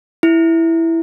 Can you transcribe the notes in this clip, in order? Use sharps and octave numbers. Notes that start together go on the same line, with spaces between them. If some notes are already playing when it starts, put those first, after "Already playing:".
E4